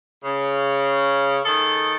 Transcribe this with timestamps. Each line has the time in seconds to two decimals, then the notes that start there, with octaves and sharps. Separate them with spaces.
0.24 C#3
1.46 D#3 G#4 A4